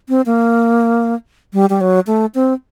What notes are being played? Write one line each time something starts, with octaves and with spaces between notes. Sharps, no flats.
C4
A#3
G3
G3
F#3
A3
C4